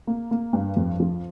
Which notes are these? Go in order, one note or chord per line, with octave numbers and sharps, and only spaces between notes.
A#3
A#3
G2
F2
F3